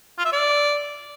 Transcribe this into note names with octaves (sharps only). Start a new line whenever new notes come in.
F4
E5
D5